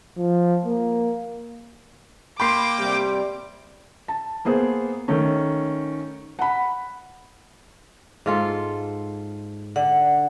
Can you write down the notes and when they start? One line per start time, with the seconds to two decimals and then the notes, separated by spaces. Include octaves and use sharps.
0.18 F3
0.66 A#3
2.40 A#3 G5 B5 C6 D6 C7
2.77 C3 G3
4.08 A5
4.45 A#3 B3 G#4 C5
5.08 D#3 A3 C#4
6.39 F#5 B5
8.26 G#2 F4 A4
9.76 D3 F#5